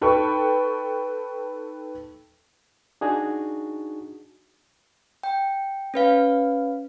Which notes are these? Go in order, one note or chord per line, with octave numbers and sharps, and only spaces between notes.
D#4 A4 B4 G5 A5 C#6
D4 D#4 F#4 G#4
G5
C#4 B4 F5